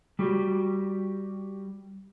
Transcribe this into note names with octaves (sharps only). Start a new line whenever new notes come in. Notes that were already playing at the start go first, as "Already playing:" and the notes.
G3 F#4 G4